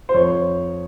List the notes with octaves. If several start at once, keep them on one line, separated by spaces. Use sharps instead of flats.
C5
F2 C#5